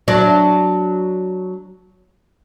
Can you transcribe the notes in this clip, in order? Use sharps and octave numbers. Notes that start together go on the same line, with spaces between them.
F#3 D4